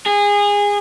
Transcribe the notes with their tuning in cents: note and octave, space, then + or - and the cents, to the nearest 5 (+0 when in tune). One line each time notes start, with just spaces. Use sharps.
G#4 -25